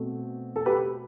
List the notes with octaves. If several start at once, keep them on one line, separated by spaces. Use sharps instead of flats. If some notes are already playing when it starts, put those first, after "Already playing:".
Already playing: B2 A3 C4
A4
G4 B4